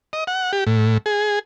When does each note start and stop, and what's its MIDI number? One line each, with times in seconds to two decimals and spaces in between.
0.13 0.24 75
0.27 0.52 78
0.53 0.64 67
0.67 0.98 45
1.06 1.39 68